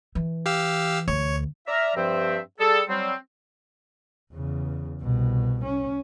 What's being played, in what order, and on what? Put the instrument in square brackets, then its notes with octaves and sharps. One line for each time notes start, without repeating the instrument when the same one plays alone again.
[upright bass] E3
[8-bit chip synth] G4 F5 E6
[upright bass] D2 [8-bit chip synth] C#5
[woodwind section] D5 E5 A#5 F6
G2 F3 C4 E5
G3 G#4 A4
F#3 G3 C4
[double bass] E2 C#3
C2 B2
C#4